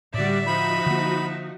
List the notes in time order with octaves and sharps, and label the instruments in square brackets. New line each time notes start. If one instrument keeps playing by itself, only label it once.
[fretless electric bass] A2 D3 [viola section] G3 F#4 D5 [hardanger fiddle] E5
[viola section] F3 D#4 F#4 [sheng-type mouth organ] B5
[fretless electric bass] D3 A#3